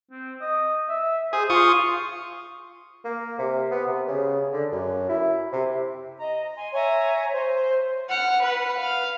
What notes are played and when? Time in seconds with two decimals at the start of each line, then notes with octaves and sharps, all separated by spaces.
0.11 C4
0.41 D#5
0.88 E5
1.33 G#4 C5
1.50 F4 C6 C#6 D#6
3.04 A#3
3.38 C3
3.71 B3
3.86 C3
4.08 C#3
4.53 D3
4.72 F#2
5.09 E4
5.52 C3
6.19 D#5 A#5
6.55 G#5 C6
6.72 C#5 E5 G#5 A#5
7.32 C5
8.09 F#5 F6
8.42 B4 F#5
8.78 F5